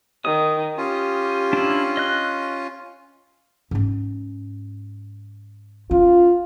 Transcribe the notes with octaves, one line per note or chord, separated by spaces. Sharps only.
D#3 D#6
C#4 F4 G4
D4 E4
D#5 F#6
G#2 C#4
C#4 F4